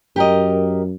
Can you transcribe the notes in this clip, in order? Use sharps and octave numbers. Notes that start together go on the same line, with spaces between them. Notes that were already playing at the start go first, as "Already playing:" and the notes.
F#2 G4 A#4 D#5